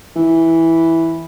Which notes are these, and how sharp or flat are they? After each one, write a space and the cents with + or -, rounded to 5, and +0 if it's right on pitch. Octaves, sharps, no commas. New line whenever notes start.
E3 -5